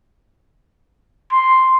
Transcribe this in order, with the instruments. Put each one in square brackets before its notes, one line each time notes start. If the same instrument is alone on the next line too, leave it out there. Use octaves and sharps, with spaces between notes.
[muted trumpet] C6